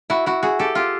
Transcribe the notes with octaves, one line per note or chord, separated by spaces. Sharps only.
E4 F#4
E4 F#4
F#4 G#4
G4 A4
F4 G4